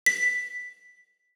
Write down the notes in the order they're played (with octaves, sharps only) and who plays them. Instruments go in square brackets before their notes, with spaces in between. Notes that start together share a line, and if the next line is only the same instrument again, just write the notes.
[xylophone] B6